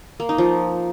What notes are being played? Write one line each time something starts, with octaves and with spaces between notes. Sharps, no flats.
A#3
D#4
F3